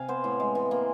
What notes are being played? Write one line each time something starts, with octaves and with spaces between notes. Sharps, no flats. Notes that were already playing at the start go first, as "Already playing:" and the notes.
Already playing: C3 F5 G#5
B3 C5
A2
G#3
E3
A#3